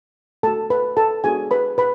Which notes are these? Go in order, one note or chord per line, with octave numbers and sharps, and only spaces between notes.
A3 D4 F#4 A4 A5
B4 B5
A4 A5
G#3 B3 D4 F#4 G#4 G#5
B4 B5
B4 B5